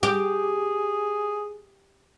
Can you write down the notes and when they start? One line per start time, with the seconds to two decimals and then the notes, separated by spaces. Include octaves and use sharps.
0.03 G4 G#4